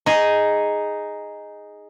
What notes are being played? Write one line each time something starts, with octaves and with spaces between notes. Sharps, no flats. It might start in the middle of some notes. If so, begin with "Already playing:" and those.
D#4 G#4